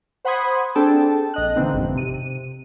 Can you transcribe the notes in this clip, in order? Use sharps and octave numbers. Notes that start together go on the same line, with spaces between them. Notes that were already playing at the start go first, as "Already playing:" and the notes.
C5 F#5 B5 C6 D#6 G#6
C4 D4 G#4 A4 G5 A5
A#1 D#5 F#6
D3 E3 A#3 C4 D#4
G#1 F2 B2
C3 D#7